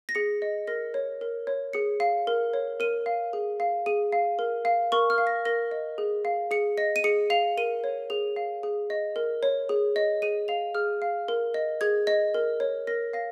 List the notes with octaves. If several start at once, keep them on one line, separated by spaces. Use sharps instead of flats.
A#6
G#4 C#7
D#5
A#4 A#6
C#5
A#4
C#5
G#4 C#7
F5
A#4
C#5
A#4 D#7
F5
G#4
F5
G#4 D#7
F5
A#4
F5
A#4 C#6
F6
F5
A#6
A#4 A#6
D#5
G#4
F5
G#4 C#7
D#5 A#6
D#7
G#4 C#7
F5 F7
A#4 D#7
C#5
G#4 F7
F5
G#4
D#5
A#4
C#5
G#4
D#5
G#4 D#7
F5 F7
G#4 F6
F5
A#4
D#5
G#4 G#6
D#5
A#4
C#5
A#4 A#6
F5 A#6